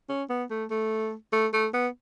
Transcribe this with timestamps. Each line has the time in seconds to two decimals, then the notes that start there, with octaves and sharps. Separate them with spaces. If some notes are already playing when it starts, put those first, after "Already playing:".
0.09 C#4
0.30 B3
0.50 A3
0.71 A3
1.33 A3
1.54 A3
1.74 B3